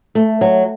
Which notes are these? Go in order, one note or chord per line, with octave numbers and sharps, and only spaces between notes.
A3
F#3